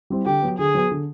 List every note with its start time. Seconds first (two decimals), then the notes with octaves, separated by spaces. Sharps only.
0.10 G3 C4 E4
0.25 D3 G4
0.42 F#3 B3
0.59 D3 G#4
0.75 F#3 B3
0.91 D3